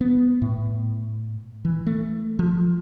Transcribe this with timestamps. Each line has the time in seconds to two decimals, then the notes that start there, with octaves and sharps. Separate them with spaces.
0.01 B3
0.42 A2
1.65 E3
1.87 A3
2.39 F3